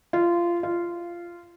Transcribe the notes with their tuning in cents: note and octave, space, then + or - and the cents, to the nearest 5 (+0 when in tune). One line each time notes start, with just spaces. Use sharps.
F4 -20
F4 -15